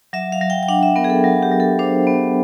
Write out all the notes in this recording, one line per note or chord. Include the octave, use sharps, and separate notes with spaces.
F#3 E5
F5
F#3
G5
G5
D4 F#5
E5
B3 A#4
G#4
A4
F#3
G4
F#3
A4
D4 C5
B3